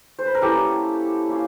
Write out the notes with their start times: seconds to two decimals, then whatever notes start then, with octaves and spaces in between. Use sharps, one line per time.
0.19 C5
0.26 B4
0.35 A#4
0.41 A#3 C#4 E4 G4 A4
1.28 A#3 C#4 F4